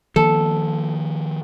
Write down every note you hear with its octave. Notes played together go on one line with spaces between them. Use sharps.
D#3 F3 A#3 A4